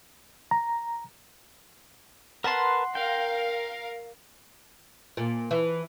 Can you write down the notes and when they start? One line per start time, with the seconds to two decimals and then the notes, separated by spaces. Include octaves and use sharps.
0.51 A#5
2.44 A#4 B4 F#5 A5 C6
2.95 A#4 F5 G5
5.17 A#2
5.51 E3